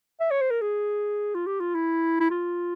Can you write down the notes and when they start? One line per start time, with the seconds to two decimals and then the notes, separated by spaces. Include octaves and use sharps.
0.20 E5
0.31 C#5
0.41 C5
0.51 A#4
0.62 G#4
1.35 F4
1.47 G4
1.60 F4
1.75 E4
2.20 E4
2.31 F4